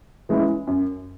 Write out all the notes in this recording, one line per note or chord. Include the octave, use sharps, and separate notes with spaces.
E3 G#3 C#4 E4
F#2